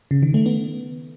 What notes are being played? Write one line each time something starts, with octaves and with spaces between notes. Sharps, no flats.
C#3
D#3
A3
B3